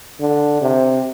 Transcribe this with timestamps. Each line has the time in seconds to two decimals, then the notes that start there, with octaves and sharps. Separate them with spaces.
0.20 D3
0.62 C3